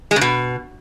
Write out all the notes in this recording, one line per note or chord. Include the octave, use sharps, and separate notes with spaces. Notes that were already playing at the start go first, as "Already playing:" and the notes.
G#3
C#3
B2